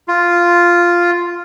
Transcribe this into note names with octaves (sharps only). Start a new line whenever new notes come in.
F4